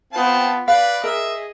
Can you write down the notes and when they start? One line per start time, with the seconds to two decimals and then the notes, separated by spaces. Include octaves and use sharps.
0.13 B3 C4 F4 G5 A5
0.68 B4 D5 F5
1.04 G#4 A#4 D#5 E5